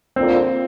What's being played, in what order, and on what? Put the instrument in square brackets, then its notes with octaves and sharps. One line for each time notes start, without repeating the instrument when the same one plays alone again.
[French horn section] F2 D3 A#3 F4 D5 [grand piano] C4